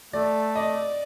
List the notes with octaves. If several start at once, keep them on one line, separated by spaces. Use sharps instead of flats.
A3 D5
D5 D#5